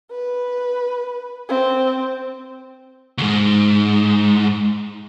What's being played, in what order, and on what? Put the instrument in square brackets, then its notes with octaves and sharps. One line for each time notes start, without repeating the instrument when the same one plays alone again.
[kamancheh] B4
C4
[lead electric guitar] D2 G#2